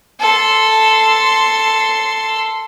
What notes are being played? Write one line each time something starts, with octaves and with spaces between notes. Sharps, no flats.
A4 C6